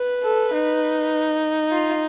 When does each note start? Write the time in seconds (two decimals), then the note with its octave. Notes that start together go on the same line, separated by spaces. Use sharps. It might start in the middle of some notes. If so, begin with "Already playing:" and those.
Already playing: B4
0.23 A4
0.53 D#4
1.71 F4